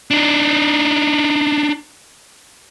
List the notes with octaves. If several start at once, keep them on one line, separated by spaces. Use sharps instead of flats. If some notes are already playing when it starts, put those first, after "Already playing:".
D4 D#4